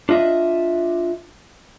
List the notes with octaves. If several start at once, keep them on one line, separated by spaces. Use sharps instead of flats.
D4 F4 D#5 E5